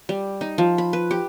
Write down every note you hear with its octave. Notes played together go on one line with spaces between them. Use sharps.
G3
D#4
F3
B5
B4
G4